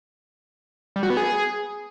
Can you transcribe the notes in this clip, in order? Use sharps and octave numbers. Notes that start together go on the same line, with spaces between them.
G3
F#4
B3
G#4